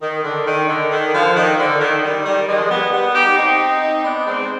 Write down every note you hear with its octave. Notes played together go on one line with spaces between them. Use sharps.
D#3
D3
D#3
D3
D#3
D3 F3
D#3
D3
D#3
D#3 G3
D#3 G3
F3 G#3
G3 B3
G3 B3
D#4 G4
C4 D#4
B3 D4
G#3 C4